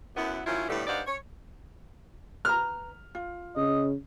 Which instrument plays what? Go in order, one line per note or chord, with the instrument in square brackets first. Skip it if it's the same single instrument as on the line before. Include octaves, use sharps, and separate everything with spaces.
[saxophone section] F#2 B3 E4
D#3 F#3 C#4 E4 F4
A2 D3 G3 A3 B3
G2 D#4 C5 D5 F5 F#5
C#5
[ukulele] B4 A#5 [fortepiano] F6
[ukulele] F4
[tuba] C#3 [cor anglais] D#5